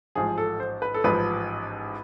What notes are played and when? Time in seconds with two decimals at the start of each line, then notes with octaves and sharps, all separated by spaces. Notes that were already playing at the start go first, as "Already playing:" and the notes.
0.15 A1 G#2 F3 G#4
0.38 A4
0.60 C5
0.82 B4
0.94 A4
1.04 A1 G#2 F3 B4